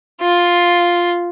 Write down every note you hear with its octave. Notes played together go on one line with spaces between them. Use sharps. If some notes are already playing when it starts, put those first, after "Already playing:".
F4